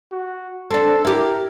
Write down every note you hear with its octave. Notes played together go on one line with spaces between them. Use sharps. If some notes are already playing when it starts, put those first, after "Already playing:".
F#4
C4 D4 A4
E4 G4 A#4